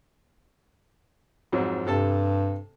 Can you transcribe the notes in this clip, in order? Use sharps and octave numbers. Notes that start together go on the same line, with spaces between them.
F2 G#2 F#3
G2 C3 A4 A5